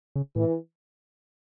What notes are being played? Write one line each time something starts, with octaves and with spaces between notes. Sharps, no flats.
C#3
A2 E3